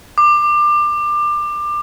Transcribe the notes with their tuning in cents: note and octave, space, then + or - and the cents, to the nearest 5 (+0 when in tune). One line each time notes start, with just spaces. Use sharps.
D6 +25